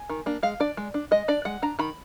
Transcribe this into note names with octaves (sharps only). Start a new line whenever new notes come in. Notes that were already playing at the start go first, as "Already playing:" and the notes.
Already playing: G#5
D#3
A#3 D4
G#3 F5
D4 D5
G#3
D4
G#3 D#5
D4 D5
G#3 F#5
D4 A#5
D#3 B5